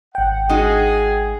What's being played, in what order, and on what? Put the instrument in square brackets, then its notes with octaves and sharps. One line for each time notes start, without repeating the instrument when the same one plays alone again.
[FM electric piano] G#1 G5 [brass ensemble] F#5
[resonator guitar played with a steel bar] G#3 D#4 F#4 [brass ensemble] G#4